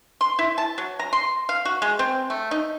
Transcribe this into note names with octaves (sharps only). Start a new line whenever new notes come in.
C6
E4
A5
F#3
A#5
C6
F5
F#4
G#3
C4
A3
D#4